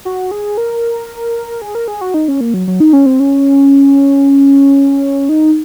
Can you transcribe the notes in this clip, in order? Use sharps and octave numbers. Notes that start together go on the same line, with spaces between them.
F#4
G#4
A#4
G#4
A#4
G#4
F#4
D#4
C#4
A#3
F#3
F#3
D#4
C#4
C4
C#4
D#4